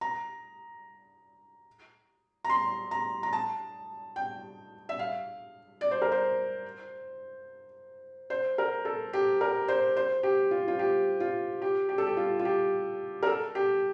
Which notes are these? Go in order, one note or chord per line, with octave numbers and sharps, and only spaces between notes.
A#5
A#5
C6
A#5
A#5
A5
G5
E5
F5
D5
C5
A#4
C5
C5
A#4
A4
G4
A#4
C5
C5
G4
F4
F4
G4
F4
G4
G4
A4
G4
F4
F4
G4
A#4
A4
G4